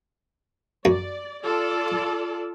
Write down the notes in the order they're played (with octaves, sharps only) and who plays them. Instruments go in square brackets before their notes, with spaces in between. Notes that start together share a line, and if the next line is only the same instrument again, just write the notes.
[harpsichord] F#2 [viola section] D5
[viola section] F4 A4 D5